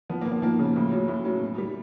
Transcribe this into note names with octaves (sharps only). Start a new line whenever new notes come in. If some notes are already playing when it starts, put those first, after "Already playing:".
F3 B3
A#3
F3
A#3
F3 A#3
C#3
A2
F#3
A2
F#3
B2
G3